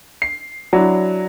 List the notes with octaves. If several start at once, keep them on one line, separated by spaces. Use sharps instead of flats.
C7
F#3 D4 E4